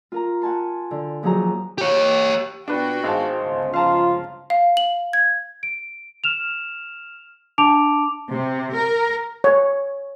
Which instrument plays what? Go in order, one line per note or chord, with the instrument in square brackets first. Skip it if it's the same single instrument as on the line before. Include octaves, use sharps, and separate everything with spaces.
[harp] F4 A#4 A#5
F#5 G#5 A5 C6
D3
D#2 F3 F#3 G#4 C5 A#5
[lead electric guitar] G4 C#5
[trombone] A#2 [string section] B3 F#4 G5 [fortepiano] D4 B4
[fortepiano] G#1 F5 A5 [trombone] C5
[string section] G1 C#2 C#3
[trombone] F3 [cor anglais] F4 [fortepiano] F5 A5 A#5
[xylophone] F5
F#7
G#6
[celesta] D7
F6 E7 F7
D4 A5 D6 D7 F7
[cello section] C3
A#4
[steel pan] C#5